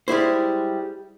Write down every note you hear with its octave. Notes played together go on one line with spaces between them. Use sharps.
G3 G#3 E4 C5